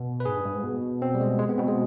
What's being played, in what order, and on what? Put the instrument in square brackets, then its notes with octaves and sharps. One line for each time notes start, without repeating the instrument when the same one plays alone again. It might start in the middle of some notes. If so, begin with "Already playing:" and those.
Already playing: [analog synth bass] B2
[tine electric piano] B4
[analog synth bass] G#2 [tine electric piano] G#4
[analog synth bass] G2
G2
G#2
B2
[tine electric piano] C4
G3
G#3
G#3
B3
[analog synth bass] B2 [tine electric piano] C4
[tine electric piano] G#3